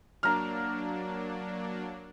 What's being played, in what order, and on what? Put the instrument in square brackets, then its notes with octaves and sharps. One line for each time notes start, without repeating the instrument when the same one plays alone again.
[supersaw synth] F#3 A#3 D4 [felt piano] A#5 F6